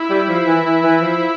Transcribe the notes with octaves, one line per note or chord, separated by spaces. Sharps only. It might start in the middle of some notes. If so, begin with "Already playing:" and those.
Already playing: E4
G3
F3
E3
E3
E3
F3